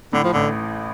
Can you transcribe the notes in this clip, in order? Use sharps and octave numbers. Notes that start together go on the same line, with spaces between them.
A2 D3
F3
A1 D3